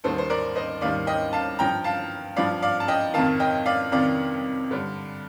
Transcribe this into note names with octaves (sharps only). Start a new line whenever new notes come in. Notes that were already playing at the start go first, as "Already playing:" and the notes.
D#2 D#3 G3 A4 C5
C5
A#4 D5
C5 D#5
D#2 D#3 G3 D5 F5
D#5 G5
F5 A5
G2 F3 G5 A#5
F5 A5
G2 F3 D5 F5
D5 F5
A5
D#5 G5
F2 C3 D#3 F5 A5
D#5 G5
D5 F5
F2 C3 D#3 D5 F5
G2 D3 G3